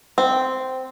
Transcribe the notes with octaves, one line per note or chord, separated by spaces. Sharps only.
C4